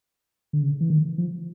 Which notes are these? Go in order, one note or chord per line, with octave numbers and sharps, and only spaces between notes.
D3
C#3
E3
D#3
F3